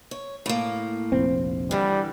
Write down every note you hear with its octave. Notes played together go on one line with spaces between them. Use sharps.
C#5
A2 A#3
F1 A#1 C4
D3 E3 G3